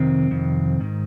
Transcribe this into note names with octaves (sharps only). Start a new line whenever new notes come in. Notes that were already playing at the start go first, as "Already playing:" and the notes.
Already playing: F2 C3 D#3 C4
F2 D#3
G#2 D#3